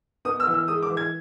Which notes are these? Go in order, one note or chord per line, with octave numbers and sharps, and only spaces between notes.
B3 D#6
E6
E3
E6
G#3 D#6
D6
E3
G#6